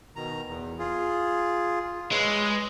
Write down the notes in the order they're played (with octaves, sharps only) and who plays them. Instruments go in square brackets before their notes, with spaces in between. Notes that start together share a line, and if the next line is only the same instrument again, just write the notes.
[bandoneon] B2 D#3 A#5
E2
F4 G#4
[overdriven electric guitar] G#3 [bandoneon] B4 C#5 E6